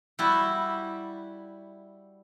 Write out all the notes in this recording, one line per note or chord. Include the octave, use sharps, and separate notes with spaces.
G3 E4 F#4